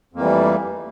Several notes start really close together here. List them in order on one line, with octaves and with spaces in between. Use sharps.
F2 A#3 E3 G3 A3